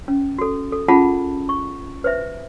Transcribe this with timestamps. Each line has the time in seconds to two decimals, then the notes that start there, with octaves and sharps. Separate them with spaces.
0.08 C#4
0.39 F#4 A4
0.72 A4
0.88 C#4 F4 G#4 F#5 A5 B5
1.49 C#6
2.04 B4 C5 E5